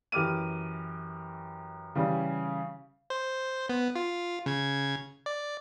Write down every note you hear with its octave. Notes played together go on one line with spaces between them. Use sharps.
F#2 E3 G4 D6 F6 D#7
C#3 E3 G3 C#4
C5
B3
F4
C#3 G#6
D5